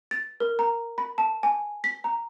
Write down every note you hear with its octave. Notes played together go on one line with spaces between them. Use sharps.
A6
A#4
A#5
B5
A5
G#5
B6
A#5